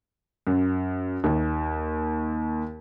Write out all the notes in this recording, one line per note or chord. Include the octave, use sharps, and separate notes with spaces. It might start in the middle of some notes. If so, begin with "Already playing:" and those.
F#2
D#2